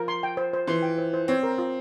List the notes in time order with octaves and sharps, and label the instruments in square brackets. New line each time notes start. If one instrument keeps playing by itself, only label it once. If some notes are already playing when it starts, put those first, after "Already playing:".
Already playing: [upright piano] F3 [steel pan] A#4
[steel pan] C6
G5
C5
C5
[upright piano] E3 [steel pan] C6
[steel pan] G5
C5
C5
[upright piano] C4 [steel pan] C#5
[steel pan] A#4
F4